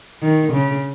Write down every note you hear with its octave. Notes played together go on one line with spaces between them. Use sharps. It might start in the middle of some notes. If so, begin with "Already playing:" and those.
D#3
C#3